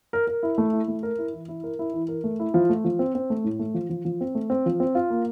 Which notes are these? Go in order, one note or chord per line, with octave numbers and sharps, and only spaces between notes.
A#4
A#4
E4
A3
E4
A3
A#4
E4
E3
E4
A#4
E4
E3
A#4
A3
E4
F3
A3
F3
C4
C4
A3
A2
A3
F3
F3
F3
C4
A3
C4
F3
C4
F4
A#3